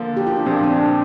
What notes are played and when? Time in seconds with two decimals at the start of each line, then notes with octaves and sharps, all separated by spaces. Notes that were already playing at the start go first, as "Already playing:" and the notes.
Already playing: D3 F3 A#3
0.17 G4
0.27 F4
0.36 D4
0.46 A#1 A#2 F3 C4
0.63 D4